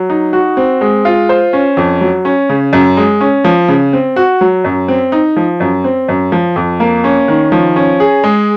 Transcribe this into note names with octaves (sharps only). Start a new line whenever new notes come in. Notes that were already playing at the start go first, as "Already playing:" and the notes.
Already playing: F#3
D#4
F#4
C4
G#3
F4
C5
C#4
F2
F#3
C#4
C#3
F#2
G#3
C#4
F3
C#3
C4
F#4
F#3
F#2
C4
D#4
F3
F#2
C4
F#2
F3
F2
A#3
C#4
D#3
F3
C#4
G#4
G#3